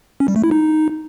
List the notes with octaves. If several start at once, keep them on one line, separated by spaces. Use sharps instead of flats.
C#4
G3
A3
E4
D#4